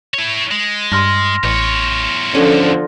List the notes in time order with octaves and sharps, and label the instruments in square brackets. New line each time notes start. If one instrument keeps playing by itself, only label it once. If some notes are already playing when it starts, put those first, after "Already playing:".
[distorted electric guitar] E4 C#5
G#3
[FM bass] G2 [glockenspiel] C6 F6 A#6
[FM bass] A1 [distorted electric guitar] E2 C#5
[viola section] D3 F3 [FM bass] C#4